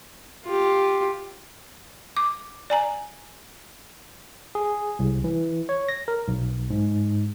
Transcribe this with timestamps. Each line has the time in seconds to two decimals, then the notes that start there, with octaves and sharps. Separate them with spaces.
0.45 F4 G4
2.17 D6
2.70 D5 G#5 A#5
4.55 G#4
4.99 C2
5.24 E3
5.69 C#5
5.89 A#6
6.08 A#4
6.28 B1
6.70 G#2